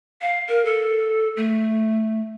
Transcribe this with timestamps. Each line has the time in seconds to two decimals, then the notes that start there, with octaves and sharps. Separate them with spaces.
0.22 F5
0.48 A#4
0.65 A4
1.37 A3